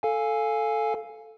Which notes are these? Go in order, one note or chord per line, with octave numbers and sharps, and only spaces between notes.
A4 F5 G#5